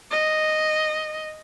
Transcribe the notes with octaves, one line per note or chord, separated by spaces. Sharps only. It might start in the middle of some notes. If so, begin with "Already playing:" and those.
D#5